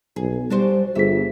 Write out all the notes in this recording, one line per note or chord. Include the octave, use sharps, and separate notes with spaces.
B1 G#4
G3 D4 F#4 C5
G1 F4 G#4 E5 B6